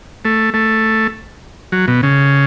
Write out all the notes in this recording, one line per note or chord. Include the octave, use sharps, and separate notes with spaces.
A3
A3
F#3
B2
C#3